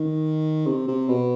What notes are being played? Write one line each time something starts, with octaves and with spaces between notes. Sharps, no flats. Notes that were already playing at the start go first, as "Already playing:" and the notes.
Already playing: D#3
C3
C3
B2